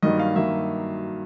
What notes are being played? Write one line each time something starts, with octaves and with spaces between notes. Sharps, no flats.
G2 D#3 F#3 A#3 D#5
F5
G2 D#3 F#3 A#3 E5